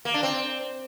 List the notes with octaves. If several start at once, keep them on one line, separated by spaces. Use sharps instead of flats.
A#3
D4
C4